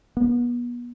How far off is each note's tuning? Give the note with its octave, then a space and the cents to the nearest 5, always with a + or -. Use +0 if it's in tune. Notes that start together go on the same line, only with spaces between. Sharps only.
B3 -35